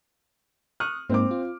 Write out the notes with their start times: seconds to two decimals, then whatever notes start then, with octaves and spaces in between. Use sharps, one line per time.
0.80 C#6 D#6 F6 F#6
1.10 G#2 A#3 C4 D#4 C5 D6
1.31 F4